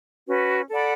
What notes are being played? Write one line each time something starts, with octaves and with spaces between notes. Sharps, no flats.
C#4 F#4 B4
A4 D5 F#5 B5